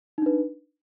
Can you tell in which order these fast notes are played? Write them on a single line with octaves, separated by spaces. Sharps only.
D#4 D4 B4